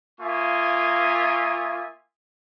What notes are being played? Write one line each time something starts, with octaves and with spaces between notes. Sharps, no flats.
A#3 F4 E5 G#5 C#6 D#6